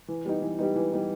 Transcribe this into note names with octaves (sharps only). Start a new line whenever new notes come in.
E3
G3 B3 D#4
E3
G3 B3 D#4
E3
G3 B3 D#4